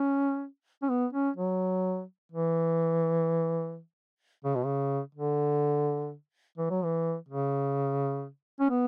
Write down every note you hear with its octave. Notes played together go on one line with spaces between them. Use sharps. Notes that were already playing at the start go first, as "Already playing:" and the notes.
Already playing: C#4
C#4
B3
C#4
F#3
E3
C#3
B2
C#3
D3
E3
F#3
E3
C#3
C#4
B3